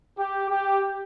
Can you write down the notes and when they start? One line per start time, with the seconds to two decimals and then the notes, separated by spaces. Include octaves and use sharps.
0.18 G4
0.49 G4